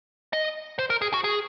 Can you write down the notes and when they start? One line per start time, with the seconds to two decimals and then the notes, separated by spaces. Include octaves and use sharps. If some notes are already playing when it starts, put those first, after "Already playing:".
0.33 D#5
0.79 C5
0.90 A#4
1.02 G#4
1.14 F#4
1.24 G#4